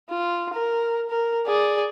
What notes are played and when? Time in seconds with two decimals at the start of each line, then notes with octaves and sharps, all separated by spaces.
0.10 F4
0.54 A#4
1.10 A#4
1.47 G#4 D5